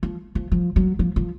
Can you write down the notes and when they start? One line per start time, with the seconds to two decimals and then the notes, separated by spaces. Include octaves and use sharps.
0.03 F3
0.35 F3
0.51 F3
0.76 F#3
0.99 F3
1.16 F3